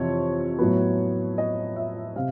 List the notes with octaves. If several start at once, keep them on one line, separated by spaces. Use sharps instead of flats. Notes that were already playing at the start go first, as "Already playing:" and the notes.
Already playing: F2 C3 E3 C#5
A2 F#3 B3
D#5
E5
C3 F5